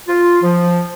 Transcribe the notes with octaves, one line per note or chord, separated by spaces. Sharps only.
F4
F3